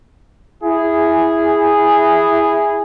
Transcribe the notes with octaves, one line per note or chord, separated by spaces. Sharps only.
E4 G#4